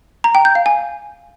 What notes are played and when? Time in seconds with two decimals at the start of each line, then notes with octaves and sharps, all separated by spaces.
0.24 A#5
0.35 G5
0.45 G6
0.55 F5
0.66 G#5